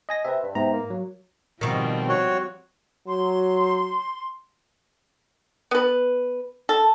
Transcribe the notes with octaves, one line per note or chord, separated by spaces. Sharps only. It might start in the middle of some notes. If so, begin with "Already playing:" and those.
D#5 G#5 A#6
C3 B4 E5
G2
G#2 C3 B3 A#5
A#3
F#3
B2 D#3 F3 G3 C4
F#4 C#5
F#3 C6
B3 B4
A4